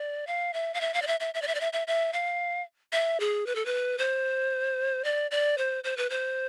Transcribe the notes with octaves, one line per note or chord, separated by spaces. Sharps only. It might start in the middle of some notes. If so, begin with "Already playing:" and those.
Already playing: D5
F5
E5
F5
E5
F5
D5
E5
E5
E5
D5
E5
D5
E5
E5
E5
F5
E5
G#4
B4
A4
B4
C5
D5
D5
C5
C5
B4
C5